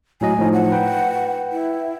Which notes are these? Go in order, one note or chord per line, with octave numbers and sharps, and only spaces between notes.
A2 F#3 D#5 G#5
A2 F3 D#4
F#5
B4 G5
E4